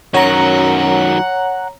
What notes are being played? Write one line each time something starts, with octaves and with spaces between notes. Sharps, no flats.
F#2 D#3 F#3 C#5 F#5 A#5